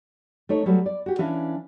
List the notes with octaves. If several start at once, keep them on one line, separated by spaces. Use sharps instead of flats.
A3 D#4 C#5
F#3 G3 A3 B4
D5
F#4 G4
E3 C#4 D4 E5 F5